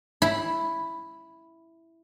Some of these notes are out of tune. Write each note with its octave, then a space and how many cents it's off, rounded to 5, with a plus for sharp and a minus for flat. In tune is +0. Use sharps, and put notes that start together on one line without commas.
E4 +0 B5 -10